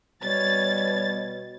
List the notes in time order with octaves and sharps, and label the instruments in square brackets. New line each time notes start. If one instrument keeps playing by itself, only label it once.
[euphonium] B2 [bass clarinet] G3 [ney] C#5 [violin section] A6